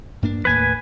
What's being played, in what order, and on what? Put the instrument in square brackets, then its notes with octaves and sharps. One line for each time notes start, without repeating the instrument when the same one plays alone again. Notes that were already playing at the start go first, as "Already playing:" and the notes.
[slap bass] G2 A#3 D4
[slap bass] D#2 A2 A#3 [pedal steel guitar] B4 G#5